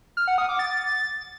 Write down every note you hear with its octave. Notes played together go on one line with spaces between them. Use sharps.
F6
F#5
D#6
D6
A6